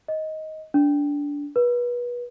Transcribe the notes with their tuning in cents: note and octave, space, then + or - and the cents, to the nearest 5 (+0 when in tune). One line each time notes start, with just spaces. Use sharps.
D#5 +10
D4 -20
B4 -30